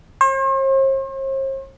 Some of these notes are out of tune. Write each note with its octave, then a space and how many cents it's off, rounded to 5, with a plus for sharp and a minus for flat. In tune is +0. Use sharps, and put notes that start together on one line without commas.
C5 +45